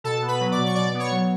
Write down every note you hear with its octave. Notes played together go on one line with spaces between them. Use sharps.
B2 A4 A5
B3
B4 B5
F#3
D5 D6
B2
C#6
B2 D5 D6
B3
C#5 C#6
F#3